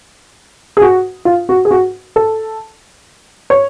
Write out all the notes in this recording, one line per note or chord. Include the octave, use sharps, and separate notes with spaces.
G#4
F#4
F4
F#4
G#4
F#4
A4
C#5